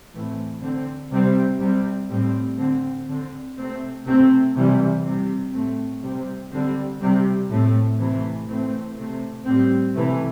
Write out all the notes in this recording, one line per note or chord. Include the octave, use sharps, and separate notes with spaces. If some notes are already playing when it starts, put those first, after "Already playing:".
A2 E3 A3 C4
D3 C4
C3 G3 C4
C3 G3 C4
A2 G3 C4
D3 C4
D3 C4
C3 A3 C4
C3 A3 C4
C3 E3 G3
C3 G3 C4
A2 A3 C4
C3 G3 C4
D3 G3 C4
C3 G3 C4
A2 A3 C4
C3 E3 A3 C4
A2 E3 A3 C4
C3 A3 C4
A2 G3 C4
C3 E3 A3